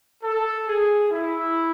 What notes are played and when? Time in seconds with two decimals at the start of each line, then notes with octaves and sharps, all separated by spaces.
0.23 A4
0.68 G#4
1.11 E4